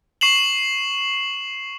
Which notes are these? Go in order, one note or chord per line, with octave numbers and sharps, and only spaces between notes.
C#6 C7 E7 F#7